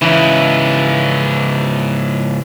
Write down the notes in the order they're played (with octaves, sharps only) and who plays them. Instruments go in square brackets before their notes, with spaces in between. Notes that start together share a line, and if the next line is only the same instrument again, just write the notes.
[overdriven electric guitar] G#2 C#3 [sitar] E3